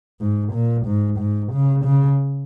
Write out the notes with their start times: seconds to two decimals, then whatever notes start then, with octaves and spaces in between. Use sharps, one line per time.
0.20 G#2
0.54 A#2
0.86 G#2
1.19 G#2
1.52 C#3
1.85 C#3